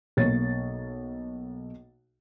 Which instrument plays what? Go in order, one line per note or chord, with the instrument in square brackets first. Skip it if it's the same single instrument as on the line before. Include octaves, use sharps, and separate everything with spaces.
[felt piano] B1 A#3 C#5 A6